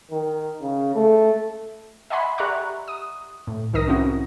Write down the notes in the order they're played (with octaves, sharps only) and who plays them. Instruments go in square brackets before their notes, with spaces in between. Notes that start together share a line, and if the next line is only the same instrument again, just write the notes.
[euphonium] D#3
C#3
A3
[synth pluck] D#5 E5 F#5 G#5 B5 C6
G4 D5 E5 A#5 C#6 F#6
D#6
A2
C2 D#3 D#4 A#4 D#6 A#6
C4 C#4 E4 F#4